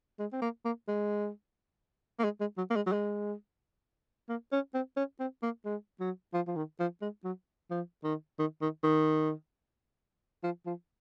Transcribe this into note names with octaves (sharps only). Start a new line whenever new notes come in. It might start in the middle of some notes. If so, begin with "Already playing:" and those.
G#3
C4
A#3
A#3
G#3
A#3
G#3
G#3
F#3
A#3
G#3
F#3
G#3
A#3
C#4
C4
C#4
C4
A#3
G#3
F#3
F3
F3
D#3
F3
G#3
F#3
F3
D#3
D#3
D#3
D#3
F3
F3